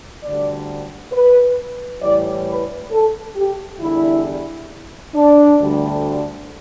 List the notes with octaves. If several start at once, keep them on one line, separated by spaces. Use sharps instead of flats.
D2 D3 G3 D5
B4
A2 E3 G3 D5
B4
A4
G4
E2 D3 G3 E4
D4
D2 D3 G3